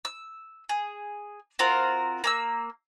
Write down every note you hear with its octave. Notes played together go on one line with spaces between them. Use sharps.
E6
G#4
C4 F4 F#4 A#4
A#3 G#5 E6